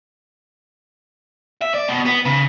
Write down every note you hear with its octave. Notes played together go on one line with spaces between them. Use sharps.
E5
D5
B2
B3
C#3